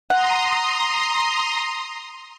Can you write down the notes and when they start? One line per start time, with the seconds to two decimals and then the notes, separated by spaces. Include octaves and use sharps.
0.10 F#5 A#5 C6 D#6